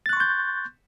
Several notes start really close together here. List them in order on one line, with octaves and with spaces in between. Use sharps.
A6 F#6 C#6 C6 G6